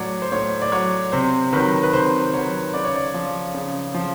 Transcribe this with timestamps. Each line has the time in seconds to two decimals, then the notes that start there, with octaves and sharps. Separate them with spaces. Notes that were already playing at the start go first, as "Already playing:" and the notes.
Already playing: A2 F#3 C#5 D5
0.22 C5
0.32 A2 C#5
0.62 D5
0.72 F#3 C#5
1.12 C3 C5
1.53 D#3 F#3 B4
1.83 B4
1.93 C3 C5
2.33 D#3 F#3 C#5
2.74 C#3 D5
2.84 C#5
2.95 D5
3.14 F3
3.54 C#3
3.94 F3